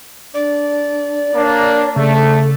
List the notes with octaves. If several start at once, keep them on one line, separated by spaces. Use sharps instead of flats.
D4 D5
A#3 D4 C#5
C#3 A3 A4